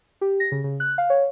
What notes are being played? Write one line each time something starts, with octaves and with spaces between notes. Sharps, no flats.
G4
A#6
C#3
C#3
F#6
F5
C#5